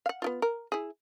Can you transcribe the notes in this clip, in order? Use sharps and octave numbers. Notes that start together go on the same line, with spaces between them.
F5 F#5
B3 E4 F4
A#4
E4 G#4